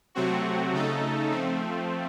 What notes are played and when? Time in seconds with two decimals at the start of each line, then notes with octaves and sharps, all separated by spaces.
0.15 C3 F#3 A3 C4 F#4
0.73 C#3 A3 D#4 A4
1.31 F3 A3 C4